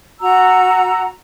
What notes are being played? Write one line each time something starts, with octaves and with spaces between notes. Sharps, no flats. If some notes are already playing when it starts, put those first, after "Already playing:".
F#4 A#5 E6